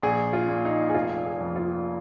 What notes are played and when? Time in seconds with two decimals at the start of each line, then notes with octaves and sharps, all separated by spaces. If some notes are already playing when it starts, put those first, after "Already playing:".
0.03 A#1 G#4
0.33 F4
0.48 A#2
0.65 D#4
0.90 G#4
0.94 F1 F4
1.25 G#4
1.41 F2
1.56 F4